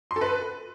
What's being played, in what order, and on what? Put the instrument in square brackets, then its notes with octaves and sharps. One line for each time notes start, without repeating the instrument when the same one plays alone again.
[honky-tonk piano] C6
A4
B4